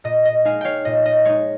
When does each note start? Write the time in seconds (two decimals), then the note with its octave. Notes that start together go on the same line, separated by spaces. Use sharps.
0.04 A#2 D#5
0.25 D#5
0.45 G#3 D#4 F5 G#5
0.61 C#5 F5 G5
0.85 A#2 D#5
1.05 D#5
1.25 G#3 D#4 C#5